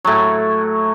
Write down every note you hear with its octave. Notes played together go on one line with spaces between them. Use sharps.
A2 F#3